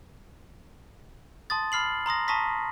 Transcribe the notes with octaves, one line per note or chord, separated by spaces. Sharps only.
A5 C6 D#6 A6
B5 F6 C7 F#7
A#5 C6 D#6 A#6
A5 A#5 C#6 D#6 A#6 B6